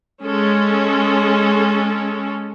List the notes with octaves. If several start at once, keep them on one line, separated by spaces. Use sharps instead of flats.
G#3 C#4 A4